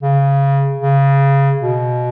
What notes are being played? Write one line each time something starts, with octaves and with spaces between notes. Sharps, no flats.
C#3
C#3
B2